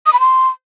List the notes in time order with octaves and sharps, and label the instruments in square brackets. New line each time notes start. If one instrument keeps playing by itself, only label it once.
[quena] D#6
B5
C6